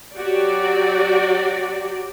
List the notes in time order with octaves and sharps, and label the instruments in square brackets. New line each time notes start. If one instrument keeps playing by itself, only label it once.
[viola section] F#3 F#4 G4 D5